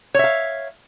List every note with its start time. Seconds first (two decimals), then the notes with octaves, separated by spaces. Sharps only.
0.14 C#5
0.19 E5
0.24 F5